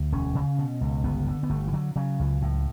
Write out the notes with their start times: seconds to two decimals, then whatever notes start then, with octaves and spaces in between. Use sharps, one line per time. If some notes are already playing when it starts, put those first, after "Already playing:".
Already playing: D2
0.12 E1 C#4
0.35 C#3
0.58 B2
0.81 C#2
1.04 G1 B3
1.27 D3
1.43 B3
1.50 G1 A3
1.67 E3
1.73 D3 F#3
1.96 C#3 F#3
2.20 C#2
2.42 A2